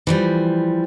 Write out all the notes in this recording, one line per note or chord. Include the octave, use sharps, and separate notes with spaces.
E3 F3 G3